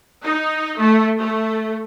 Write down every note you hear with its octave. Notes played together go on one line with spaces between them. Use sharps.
D#4
A3
A3